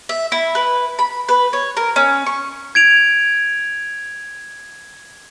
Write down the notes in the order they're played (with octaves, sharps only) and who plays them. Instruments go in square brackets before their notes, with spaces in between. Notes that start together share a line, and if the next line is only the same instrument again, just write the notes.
[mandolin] E5
E4
B4
B5
B4
C#5
A#4
C#4
C#6
[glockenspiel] G#6 D7 F7